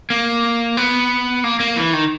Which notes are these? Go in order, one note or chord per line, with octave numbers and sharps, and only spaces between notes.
A#3
B3
A#3
A#3
E3
D#3